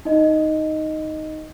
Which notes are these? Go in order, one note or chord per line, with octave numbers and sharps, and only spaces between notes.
D#4 D#5